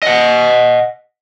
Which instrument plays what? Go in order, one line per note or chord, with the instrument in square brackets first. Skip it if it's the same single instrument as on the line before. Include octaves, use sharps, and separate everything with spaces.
[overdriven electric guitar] D#5 F#5